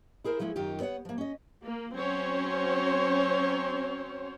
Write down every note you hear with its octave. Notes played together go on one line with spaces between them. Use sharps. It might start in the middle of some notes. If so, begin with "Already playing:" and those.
E4 G#4 A#4 C5
F3 G#3 A3 E4
F#2 D#3 D#4 F4 G4
B3 C#5 D#5 F#5
F3 A#3
C#4 D#5
A#3
F#3 C4 C#4 C5 C#5